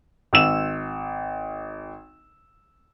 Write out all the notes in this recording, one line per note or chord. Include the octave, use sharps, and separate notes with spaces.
G#1 E6 E7